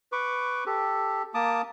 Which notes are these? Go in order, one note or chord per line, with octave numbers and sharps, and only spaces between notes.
B4 C#6 D6
G4 A4
A#3 A5 D6 D#6